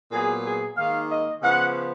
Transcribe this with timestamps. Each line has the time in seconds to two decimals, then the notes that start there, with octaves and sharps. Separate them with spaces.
0.11 A#2 F#3 B3 G#4
0.44 G#4
0.76 G#2 D#3 A#3 F5
1.10 D#5
1.41 C#3 F3 B3 F#5